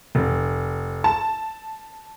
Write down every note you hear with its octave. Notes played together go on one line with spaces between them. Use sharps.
F1
A5